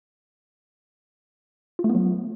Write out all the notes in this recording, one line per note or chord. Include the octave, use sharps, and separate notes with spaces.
F4
A3
B3
F#3